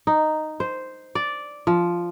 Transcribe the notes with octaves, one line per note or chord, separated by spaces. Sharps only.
D#4
C5
D5
F3